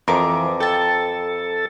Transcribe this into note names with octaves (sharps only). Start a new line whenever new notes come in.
F2 E3 A#4 D6
A4 G5 A5